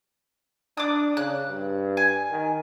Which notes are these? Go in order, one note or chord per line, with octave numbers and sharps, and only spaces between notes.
D4 D6 D#6
C#3 F#6
G2
G#5
D#3